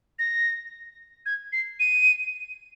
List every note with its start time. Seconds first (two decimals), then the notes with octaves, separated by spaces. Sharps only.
0.19 A#6
1.26 G#6
1.53 C7
1.80 D#7